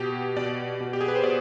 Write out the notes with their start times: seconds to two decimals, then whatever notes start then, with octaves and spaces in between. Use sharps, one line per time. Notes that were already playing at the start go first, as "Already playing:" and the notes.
Already playing: B2 G4
0.37 B2 D5
0.81 B2
0.93 G4
1.01 G#4
1.08 B4
1.16 C5
1.23 B2 D5